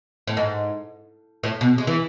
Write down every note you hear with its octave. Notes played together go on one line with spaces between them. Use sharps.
A2
G#2
A2
B2
G#3
E3